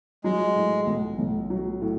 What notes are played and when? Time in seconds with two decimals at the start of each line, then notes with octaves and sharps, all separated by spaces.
0.24 F#3 G#3
0.56 A2
0.86 B1
1.19 B1
1.50 F#3
1.81 A2